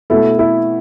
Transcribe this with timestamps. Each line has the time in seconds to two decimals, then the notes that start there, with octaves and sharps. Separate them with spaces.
0.10 B2 A3 E4 A4
0.39 E4 A4